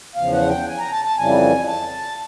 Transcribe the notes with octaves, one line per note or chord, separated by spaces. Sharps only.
E2 C#3 F3 F5
F#5
G5
G#5
A#5
A5
A5
F2 C#3 E3 G3 G#5
A5